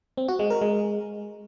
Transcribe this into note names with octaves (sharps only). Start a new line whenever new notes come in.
C4
F#4
G#3
A#4
G#3